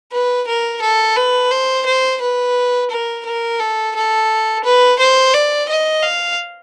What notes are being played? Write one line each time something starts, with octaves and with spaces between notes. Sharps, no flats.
B4
A#4
A4
B4
C5
C5
B4
A#4
A#4
A4
A4
B4
C5
D5
D#5
F5